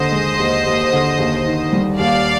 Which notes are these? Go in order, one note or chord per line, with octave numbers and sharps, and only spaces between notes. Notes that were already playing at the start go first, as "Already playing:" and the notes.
Already playing: D#2 D3 C5 D#5
G#3
D#2
D#2
D3
D#2
D#3
G3
D#2 D5 F5